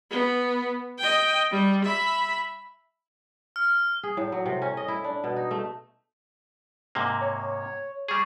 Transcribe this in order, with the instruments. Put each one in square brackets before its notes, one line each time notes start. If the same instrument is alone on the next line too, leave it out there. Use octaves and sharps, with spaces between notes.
[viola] B3
D#5 G5
G3
E5 B5
[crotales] F6
[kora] G#4
A2
F#3
C3
C#4
D#5
E4
D4
B2
D#4
A3
[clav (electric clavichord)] G#2 C3 A#3
[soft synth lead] C#5
[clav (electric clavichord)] G3 G#4 [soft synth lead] C#6